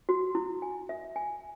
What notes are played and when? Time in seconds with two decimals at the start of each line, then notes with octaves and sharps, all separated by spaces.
0.09 F#4
0.35 E4
0.62 G#5
0.89 E5
1.16 G#5